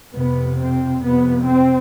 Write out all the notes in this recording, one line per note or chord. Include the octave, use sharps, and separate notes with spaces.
F2 C3 B3
C4
F2 C3 B3
C4